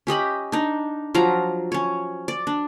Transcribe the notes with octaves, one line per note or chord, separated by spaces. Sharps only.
C#4 G4 D#5 B5
D4 D#4
F3 F#3 F5 A#5
C#4 C#5
D5
D4